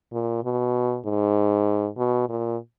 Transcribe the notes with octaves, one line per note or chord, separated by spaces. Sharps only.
A#2
B2
G#2
B2
A#2